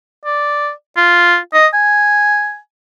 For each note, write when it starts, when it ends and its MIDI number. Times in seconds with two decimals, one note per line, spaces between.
0.25 0.70 74
0.97 1.37 65
1.54 1.67 75
1.74 2.58 80